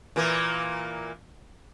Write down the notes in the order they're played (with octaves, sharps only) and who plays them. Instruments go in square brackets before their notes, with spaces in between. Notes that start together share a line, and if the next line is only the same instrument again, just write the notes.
[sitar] A#2 E3 A#3